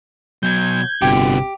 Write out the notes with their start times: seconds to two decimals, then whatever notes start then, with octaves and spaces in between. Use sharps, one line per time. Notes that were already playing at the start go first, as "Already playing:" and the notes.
0.43 B2 F#3 G6 G#6
1.02 G1 C3 F#4 G4